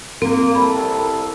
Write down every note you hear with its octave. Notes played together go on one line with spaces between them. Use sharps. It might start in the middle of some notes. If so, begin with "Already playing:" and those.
A#3 C4 A#4
C2 A4 B5